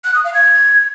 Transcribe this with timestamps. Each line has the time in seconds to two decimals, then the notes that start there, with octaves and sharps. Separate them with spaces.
0.05 F#6
0.14 D#6
0.24 F5
0.34 G#6